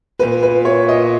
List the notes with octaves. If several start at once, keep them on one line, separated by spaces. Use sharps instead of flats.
A#2 B4
B4
C#5
D#5